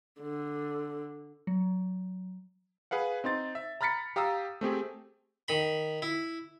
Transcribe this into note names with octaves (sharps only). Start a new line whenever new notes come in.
D3
F#3
G#4 B4 F5 F#5
C4 D#4 C6 A6
E5
A#5 B5 F6 A6 B6 C#7
G4 F5 A#5 D#6 E6
A3 C4 G4 G#4
D#3 B5
E4